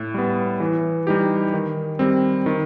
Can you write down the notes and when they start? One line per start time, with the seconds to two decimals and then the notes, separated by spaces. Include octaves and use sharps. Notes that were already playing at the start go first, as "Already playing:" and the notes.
Already playing: A2
0.14 G3 B3
0.60 E3
1.07 G3 D#4 G4
1.54 D#3
1.99 G3 C4
2.46 D#3